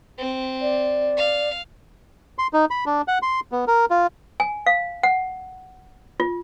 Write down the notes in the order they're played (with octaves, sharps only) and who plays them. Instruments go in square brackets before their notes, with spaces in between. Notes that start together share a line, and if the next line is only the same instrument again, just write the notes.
[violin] C4
[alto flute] D5
[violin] F5
[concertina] C6
D#4
B5
D4
F#5
C6
B3
A#4
F4
[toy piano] G#5
F5
F#5
F4